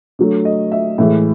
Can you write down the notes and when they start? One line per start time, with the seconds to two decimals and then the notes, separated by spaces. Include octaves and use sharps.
0.19 D3 F#3 A3
0.45 D#5
0.72 E5
0.98 A2 E3 G#3 E5